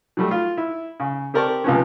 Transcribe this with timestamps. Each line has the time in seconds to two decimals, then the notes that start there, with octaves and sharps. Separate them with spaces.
0.17 F#3 G3 A3
0.31 F4
0.57 E4
1.00 C#3
1.34 C4 G4 A#4 D5 A5 C#6
1.64 C#2 C3 F3 B3 C#4